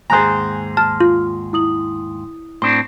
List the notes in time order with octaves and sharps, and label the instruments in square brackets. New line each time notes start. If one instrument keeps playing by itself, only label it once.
[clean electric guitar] D#2 G#2 C5 [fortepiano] G#4 A#5 [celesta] G#5 F#6 G6
[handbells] A5 [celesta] F6
[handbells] F4
[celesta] E4 D#6 F#7
[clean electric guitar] A2 C4 D4 [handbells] C6